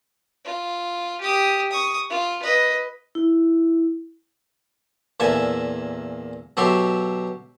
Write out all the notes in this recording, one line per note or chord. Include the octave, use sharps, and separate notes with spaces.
F4
G4 D#6
C#6 D#6
F4
B4 D#5
E4
E2 A#2 A4 E5 G#5
B2 F#3 G4 A4 E5 C6